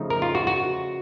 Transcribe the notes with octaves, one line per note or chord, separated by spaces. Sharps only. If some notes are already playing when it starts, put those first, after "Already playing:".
Already playing: C#3 F3 A3 D#4
A#4
F4
F#4
F#4